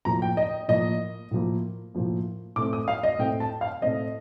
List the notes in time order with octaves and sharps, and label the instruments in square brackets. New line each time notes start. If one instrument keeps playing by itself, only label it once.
[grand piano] A2 F3 A#3 A#5
G5
D#5
A2 F3 A#3 D#5
A2 F3 A#3
A2 F3 A#3
A2 A3 C4 D6
D#6
F5
D#5
A2 A3 C4 G5
A5
F5
A2 A3 C4 D#5